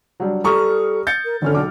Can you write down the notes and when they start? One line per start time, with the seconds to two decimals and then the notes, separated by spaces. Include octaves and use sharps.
0.20 F#3 G3 D4
0.44 G3 A4 A#5 C#6 D#6 F6
1.07 G6 A6 C#7
1.25 A#4
1.42 G#1 D3 C#4 D4 F6
1.55 B1 A4 D6